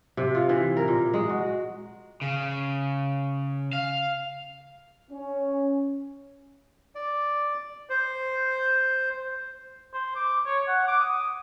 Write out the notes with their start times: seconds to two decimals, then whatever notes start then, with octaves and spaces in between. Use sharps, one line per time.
0.17 C3
0.35 F4
0.49 E3
0.77 A#4
0.88 A#2
1.14 G#3
1.29 F#4
2.21 C#3
3.73 F5
5.11 C#4
6.95 D5
7.90 C5
9.94 C5
10.16 D6
10.46 C#5
10.68 F#5
10.88 D6
11.00 D#6